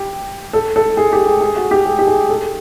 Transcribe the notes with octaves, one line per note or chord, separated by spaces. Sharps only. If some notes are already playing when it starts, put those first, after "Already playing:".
Already playing: G4
A4
A4
G#4
G4
G#4
G#4
F#4
G4
G#4
G4
G#4
A4